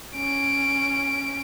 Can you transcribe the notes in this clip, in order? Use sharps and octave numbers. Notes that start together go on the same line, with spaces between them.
C#4 D7